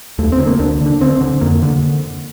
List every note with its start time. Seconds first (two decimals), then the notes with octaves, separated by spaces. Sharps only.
0.19 D#2 A3
0.32 C4
0.39 D3
0.47 A#3
0.59 D2 D4
0.81 D3
0.86 D4
1.01 D2 C4
1.21 D3
1.41 F2 A#3
1.62 D3